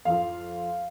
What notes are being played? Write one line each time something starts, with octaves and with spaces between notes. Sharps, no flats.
F2 F3 F5